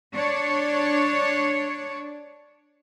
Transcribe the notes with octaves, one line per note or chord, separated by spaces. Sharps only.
D4 C#5